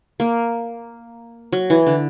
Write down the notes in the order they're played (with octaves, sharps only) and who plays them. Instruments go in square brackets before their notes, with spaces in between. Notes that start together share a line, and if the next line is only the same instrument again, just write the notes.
[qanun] A#3
F#3
E3
D3